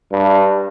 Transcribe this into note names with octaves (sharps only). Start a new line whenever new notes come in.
G2